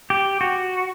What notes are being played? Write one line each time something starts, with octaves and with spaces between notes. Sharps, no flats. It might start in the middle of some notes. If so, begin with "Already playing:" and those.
G4
F#4